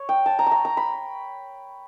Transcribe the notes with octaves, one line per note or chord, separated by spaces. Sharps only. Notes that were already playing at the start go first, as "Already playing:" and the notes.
Already playing: C#5
G5
A5
A#5
A5
A#5
A#5
B5